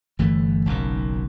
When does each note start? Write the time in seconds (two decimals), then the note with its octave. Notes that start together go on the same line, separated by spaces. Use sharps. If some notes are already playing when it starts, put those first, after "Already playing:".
0.19 G1 E3 A3
0.66 F#1 B1 F#2 D#3